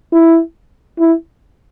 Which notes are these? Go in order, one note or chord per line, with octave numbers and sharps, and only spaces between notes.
E4
E4